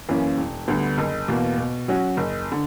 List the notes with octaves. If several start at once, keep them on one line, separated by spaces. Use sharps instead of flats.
F#2 E3 A#3 C#4
E1
D2 D3 G3 B3
F#1
E2 B2 A#3
B2
F#3 C#4 F#4
F#1
D3